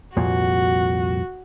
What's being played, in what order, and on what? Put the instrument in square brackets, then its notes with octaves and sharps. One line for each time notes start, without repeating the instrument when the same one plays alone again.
[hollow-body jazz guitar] C2 F2 A#2 [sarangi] F#4